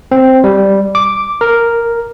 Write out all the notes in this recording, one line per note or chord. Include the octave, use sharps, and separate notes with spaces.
C4
G3
D6
A#4